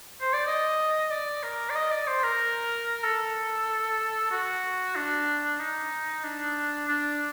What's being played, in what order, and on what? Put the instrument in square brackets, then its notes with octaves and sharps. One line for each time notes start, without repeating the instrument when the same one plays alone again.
[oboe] C5
D5
D#5
D5
A#4
D5
D#5
D5
C5
A#4
A4
F#4
D4
D#4
D4
D4